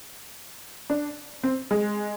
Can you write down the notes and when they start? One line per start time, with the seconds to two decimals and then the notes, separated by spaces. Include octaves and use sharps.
0.90 D4
1.43 C4
1.71 G#3